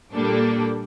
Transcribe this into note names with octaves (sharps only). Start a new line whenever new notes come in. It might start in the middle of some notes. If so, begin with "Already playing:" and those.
A#2 G3 A#3 D4 A4